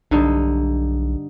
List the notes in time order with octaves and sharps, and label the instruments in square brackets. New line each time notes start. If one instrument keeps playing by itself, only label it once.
[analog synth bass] B1 [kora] G2 D3 D#4